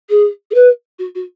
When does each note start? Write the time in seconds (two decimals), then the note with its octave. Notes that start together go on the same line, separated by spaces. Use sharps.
0.10 G#4
0.51 G#4
0.54 B4
0.99 F#4
1.15 F#4